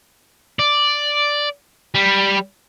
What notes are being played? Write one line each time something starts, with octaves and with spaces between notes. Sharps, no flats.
D5
G3